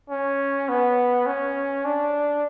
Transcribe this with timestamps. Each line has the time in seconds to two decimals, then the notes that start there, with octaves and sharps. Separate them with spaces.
0.10 C#4
0.69 B3
1.27 C#4
1.85 D4